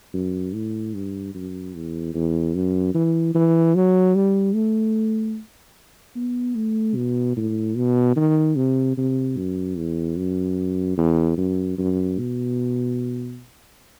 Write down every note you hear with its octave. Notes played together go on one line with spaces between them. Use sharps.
F#2
A2
G2
F#2
E2
E2
F#2
E3
E3
F#3
G3
A3
B3
A3
B2
A2
B2
D#3
C3
C3
F#2
E2
F#2
E2
F#2
F#2
B2